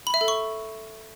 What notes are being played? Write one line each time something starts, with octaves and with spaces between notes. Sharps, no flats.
B5
E5
A4
C#6